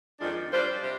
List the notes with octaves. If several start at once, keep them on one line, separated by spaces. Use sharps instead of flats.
F2 D#3 G#3 D4 F4
G3 D4 F4 C5
C3